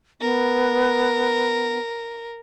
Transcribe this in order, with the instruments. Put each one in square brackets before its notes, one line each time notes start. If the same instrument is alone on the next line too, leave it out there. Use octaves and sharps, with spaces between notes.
[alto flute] B3 [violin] A#4